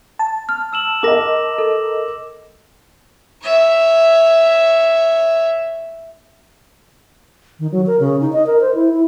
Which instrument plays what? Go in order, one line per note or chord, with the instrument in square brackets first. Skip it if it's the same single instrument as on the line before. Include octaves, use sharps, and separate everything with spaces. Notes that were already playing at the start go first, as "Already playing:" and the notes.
[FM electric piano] A5
[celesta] F6
[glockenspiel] E6 E7 F#7
[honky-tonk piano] A#4 D#5 [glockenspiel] D6 A#6
[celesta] A4
[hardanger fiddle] C#5 E5
[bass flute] D#3
F#3
A#4
C#3
D#4
D#5
A#4
C5
E4
E4